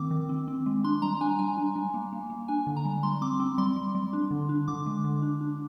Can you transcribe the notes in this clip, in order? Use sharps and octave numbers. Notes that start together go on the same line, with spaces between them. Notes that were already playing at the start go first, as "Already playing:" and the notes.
Already playing: D#3 A#3 C4 D6
D#3
C4
C4
G#3
D4 C6
G3 A#5
D4 G#5
G3 G#5
D4
G3
A#3
A#3
A#3
D4 G#5
D3
A#5
G3
G3 C6
C4 D6
C4
G3 C6
G3
G3
D4
D3
D4
D3 D6
G#3
D3
D4
D4